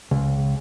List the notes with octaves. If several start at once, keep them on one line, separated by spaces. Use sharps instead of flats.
C#2